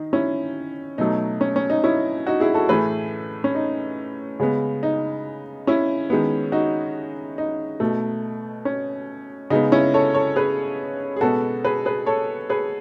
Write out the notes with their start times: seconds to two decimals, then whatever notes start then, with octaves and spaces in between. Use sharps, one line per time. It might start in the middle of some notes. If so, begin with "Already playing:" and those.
Already playing: D#3 D#4
0.13 C#4 E4
0.98 B2 F#3 A3 D#4
1.41 C#4
1.56 C#4
1.70 D#4
1.84 C#4 E4
2.27 D#4 F#4
2.40 E4 G#4
2.54 F#4 A4
2.69 A2 E3 A3 G#4 B4
3.44 C#4
3.55 D#4
4.40 C#3 G#3 B3
4.83 D#4
5.67 C#4 E4
6.10 D#3 G#3 B3
6.52 D#4 F#4
7.38 D#4
7.80 B2 A3
8.65 C#4
9.50 C#3 G#3 B3 D#4
9.72 C#4 E4
9.94 A4 C#5
10.14 A4 C#5
10.36 G#4 B4
11.16 G#4
11.21 B2 G#3 B3 F#4 A4
11.65 G#4 B4
11.86 G#4 B4
12.06 A4 C#5
12.50 G#4 B4